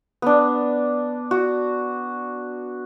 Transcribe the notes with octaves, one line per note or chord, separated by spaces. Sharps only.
B3 D4
F#4